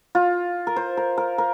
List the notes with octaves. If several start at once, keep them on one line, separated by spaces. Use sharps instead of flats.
F4
A#4
C5
A#4
A#4
A#4